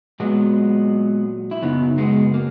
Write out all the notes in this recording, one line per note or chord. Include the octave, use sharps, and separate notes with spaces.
A#2 F#3 G#3 B3
E4
F#2 C#3 F#3 B3 D#4
G#3 B3
A#3